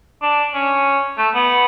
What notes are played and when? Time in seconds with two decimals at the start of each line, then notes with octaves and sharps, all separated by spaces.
0.22 D4
0.54 C#4
1.17 A3
1.34 B3